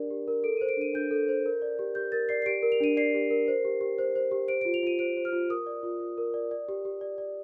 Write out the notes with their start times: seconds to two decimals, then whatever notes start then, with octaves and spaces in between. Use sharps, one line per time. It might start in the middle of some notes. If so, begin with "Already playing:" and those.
Already playing: D4 G4 A#4 D5
0.10 G4
0.28 A#4
0.44 A4 D7
0.57 D#7
0.61 C5
0.69 D7
0.77 D4 D#7
0.94 D4 G6
1.11 A4
1.29 C5
1.46 A#4
1.62 D5
1.79 G4
1.95 G4 G6
2.12 A#4 A6
2.29 D5 C7
2.42 C7
2.46 G4 D7
2.63 A#4
2.72 F7
2.80 D4 D#7
2.97 D5 C7
3.14 G4
3.30 A#4
3.48 C5
3.65 G4
3.81 G4
3.99 C5
4.15 C5
4.31 G4
4.48 C5 D7
4.61 D7
4.65 F4
4.74 F7
4.83 F4 D#7
4.99 C5 D7
5.17 C5
5.25 F6
5.32 F4
5.50 A#4 D#6
5.66 D5
5.83 F4
6.00 F4
6.18 A#4
6.34 D5
6.51 D5
6.69 G4
6.85 G4
7.01 D5
7.18 D5